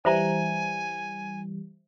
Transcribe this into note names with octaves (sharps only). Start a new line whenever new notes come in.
E3 G3 C5 E5 G#5 A#5